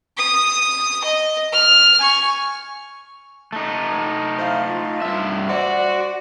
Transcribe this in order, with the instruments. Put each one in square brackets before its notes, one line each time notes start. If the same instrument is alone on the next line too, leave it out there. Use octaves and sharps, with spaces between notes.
[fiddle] D#6
D#5
F6
G#5 C#6
[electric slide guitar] A3 D#4
[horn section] E4 C5 F5
F4
[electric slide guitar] G2 E5
[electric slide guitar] F#4 [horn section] C5 D5